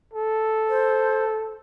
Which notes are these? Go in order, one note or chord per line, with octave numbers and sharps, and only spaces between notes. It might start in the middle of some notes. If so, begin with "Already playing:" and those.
A4
C5